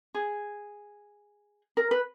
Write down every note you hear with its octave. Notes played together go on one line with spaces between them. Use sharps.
G#4
A#4
B4